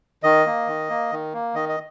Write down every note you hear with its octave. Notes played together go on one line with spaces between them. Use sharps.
D#3 D#5
A#3
D#3
A#3
D#3
A#3
D#3 D#5
D#5